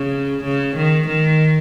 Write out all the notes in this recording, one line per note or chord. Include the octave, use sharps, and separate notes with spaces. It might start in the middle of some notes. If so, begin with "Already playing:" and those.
Already playing: C#3
C#3
D#3
D#3